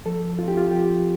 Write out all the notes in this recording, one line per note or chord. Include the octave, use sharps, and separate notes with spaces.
F3 A4
C4 E4 F4
G4
F4
F3 G4